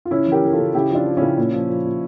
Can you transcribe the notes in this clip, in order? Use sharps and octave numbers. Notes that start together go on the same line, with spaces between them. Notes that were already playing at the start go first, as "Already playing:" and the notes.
F4
C#3 C#4 E4
E3
G4 A#4
E3 A#4
F4 A4
C#3
C#3 E4 G4
F3
D4 F4
F3
C#3 C#4 E4
A#2
F3
F3
A#2